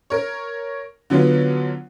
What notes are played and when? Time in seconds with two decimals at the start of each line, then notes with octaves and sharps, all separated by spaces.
0.10 A#4 C#5
1.10 D3 F#3 B3 F4